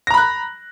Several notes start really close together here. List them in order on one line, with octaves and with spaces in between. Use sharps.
A#6 A#5 B5 F#6